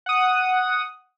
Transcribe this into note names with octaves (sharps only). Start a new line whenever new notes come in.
F#5 D#6